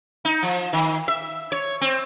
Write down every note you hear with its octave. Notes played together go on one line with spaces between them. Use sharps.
D#4
F3
D#3
E5
C#5
C4